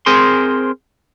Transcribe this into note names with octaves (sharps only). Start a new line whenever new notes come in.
C4 G#4 A#4 C5 G#5 C6